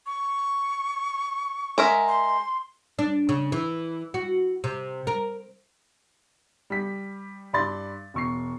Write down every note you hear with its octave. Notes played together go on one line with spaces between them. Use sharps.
C#6
G#3 A#4 E5
C6
D4
C#3
E3
F#4
C3
A#4
G3 B6
G2 D5 B5 C6 A6
E1 C#6 C7